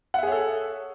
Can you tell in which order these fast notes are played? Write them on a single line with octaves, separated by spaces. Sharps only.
F#5 E5 G#4 C#5 A4